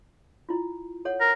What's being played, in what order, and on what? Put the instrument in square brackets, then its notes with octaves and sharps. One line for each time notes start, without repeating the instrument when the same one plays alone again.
[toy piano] E4 F4
A4 C#5 F#5
[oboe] A#4